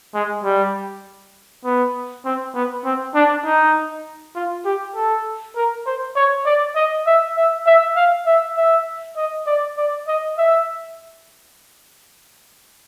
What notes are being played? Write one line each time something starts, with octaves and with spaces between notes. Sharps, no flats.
G#3
G3
B3
C4
B3
C4
D4
D#4
F4
G4
A4
A#4
C5
C#5
D5
D#5
E5
E5
E5
F5
E5
E5
D#5
D5
D5
D#5
E5